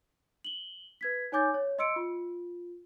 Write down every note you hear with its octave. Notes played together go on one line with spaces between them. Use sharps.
F#7 G7
B4 G#6 B6
D#4 C#5 G#5 D6 G6 A6
C#5
D#5 C6 E6 C#7 D7
F4